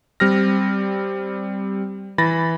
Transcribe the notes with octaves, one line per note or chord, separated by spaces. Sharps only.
G3 C4 F6 A#6
E3 B5 A6 A#6